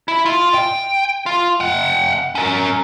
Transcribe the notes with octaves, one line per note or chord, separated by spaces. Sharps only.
E4
F4
G5
F4
F#5 G5
C#4 A#4